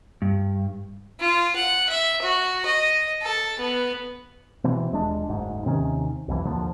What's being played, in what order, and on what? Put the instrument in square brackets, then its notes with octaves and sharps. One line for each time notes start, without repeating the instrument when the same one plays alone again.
[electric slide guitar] G2
[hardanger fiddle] F4
F#5
E5
F#4
D#5
A4
B3
[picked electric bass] B2 E3 C4
D#1 G#3 D4
F#1 D2 G#2
D#2 C3 D#3 C#4
B1 F2 E3
D#2 A#2 D3 F3